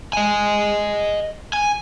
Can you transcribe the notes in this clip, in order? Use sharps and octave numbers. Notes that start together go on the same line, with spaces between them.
D#5 G#5
G#5